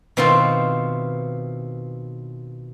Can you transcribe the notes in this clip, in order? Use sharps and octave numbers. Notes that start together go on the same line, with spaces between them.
B2 D#3 C4 E4 F4